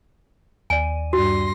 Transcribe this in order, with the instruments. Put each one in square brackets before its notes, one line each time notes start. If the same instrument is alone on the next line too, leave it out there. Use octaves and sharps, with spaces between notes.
[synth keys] D#2 D5 D#7 [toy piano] G#5
[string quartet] G2 C6 A#6 [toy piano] F#4